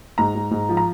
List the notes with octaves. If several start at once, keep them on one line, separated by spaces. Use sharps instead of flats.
G#2 A#5
G#2
G#2
F3
A#5